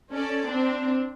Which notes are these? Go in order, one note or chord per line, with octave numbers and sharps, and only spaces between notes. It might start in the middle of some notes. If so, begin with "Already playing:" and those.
C#4 A4 D5
C4 D4